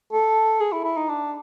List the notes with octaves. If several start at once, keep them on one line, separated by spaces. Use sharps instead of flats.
A4
G#4
E4
E4
D#4
D4